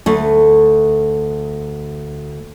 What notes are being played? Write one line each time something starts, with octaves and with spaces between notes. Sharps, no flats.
D2 A3